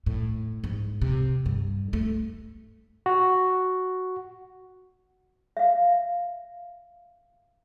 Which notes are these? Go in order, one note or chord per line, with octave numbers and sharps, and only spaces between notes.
A2
G#2
C3
G2
A3
F#4
E5 F5